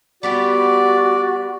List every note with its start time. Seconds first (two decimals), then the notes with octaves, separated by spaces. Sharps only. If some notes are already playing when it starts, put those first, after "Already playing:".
0.23 G3 B3 F#4 G4 D5